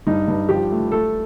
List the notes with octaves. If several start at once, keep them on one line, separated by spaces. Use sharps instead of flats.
G2 D#4
G2
F3 G4
A3
A3 A4